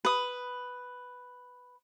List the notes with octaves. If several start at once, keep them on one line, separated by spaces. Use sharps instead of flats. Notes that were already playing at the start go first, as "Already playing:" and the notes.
B4 D#6